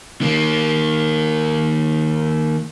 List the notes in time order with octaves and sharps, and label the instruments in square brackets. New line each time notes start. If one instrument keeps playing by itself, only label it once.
[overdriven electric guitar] D#3 A#3